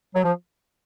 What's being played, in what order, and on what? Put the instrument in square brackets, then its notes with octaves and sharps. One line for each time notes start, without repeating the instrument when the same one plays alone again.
[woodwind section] F#3
F3